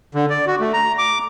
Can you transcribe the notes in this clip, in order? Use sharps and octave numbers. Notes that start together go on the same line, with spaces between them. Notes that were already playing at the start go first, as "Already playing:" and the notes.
D3
D5
F#4
A3
A#5
D6